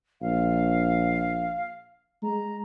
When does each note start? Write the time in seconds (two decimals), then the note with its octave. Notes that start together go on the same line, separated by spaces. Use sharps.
0.21 A#1 F5
2.23 G#3 A#5